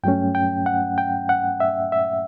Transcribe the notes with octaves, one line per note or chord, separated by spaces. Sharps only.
G2 F#3 A3 C#4 G5
G5
F#5
G5
F#5
E5
E5